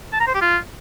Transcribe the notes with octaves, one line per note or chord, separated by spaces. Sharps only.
A5
A#5
C5
G4
F4